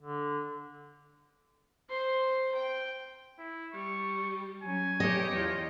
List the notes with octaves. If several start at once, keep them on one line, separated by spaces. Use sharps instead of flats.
D3
C5 C6
G5
E4
G3 C#6
F#3 C#4 G#5
B3 G4 C#5 D#5 G5
E2 F4